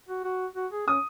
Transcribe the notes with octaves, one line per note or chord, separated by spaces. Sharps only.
F#4
F#4
F#4
G#4
C#4 D#6